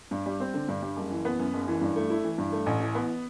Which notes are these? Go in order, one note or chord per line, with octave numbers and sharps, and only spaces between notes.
G2
G3
C4
D3
G2
G3
F#1
E3
B3
F#2
F#1
E3
G2
A3
E4
E3
G2
A3
A1
E3
B3